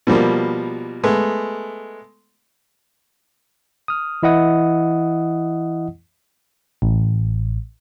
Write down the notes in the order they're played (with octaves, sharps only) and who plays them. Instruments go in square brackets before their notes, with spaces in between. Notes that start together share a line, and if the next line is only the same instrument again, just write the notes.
[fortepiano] B2 F3 G3 A#3
G#3 A3 B3
[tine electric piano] D#6 F6
E3 E4 D#5 F#5 D#6
[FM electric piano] A1